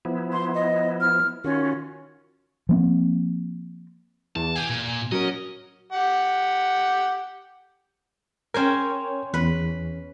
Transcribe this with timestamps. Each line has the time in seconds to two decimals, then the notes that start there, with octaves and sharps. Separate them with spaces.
0.05 F3 B3 E4
0.32 C6
0.55 D#5
1.01 F6
1.44 D#3 C#4 F4 F#4
2.69 F3 A#3 C4
4.36 E2 A5
4.56 G4 G#4 G#5
4.70 A#2
5.12 F#3 C#4 A#4 D#5
5.92 G4 F#5
8.54 C#4 A#4 C5 C#5 G5 G#5
9.34 E2 B4